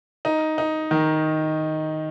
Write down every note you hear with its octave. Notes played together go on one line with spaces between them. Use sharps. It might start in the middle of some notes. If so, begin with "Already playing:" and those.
D#4
D#4
D#3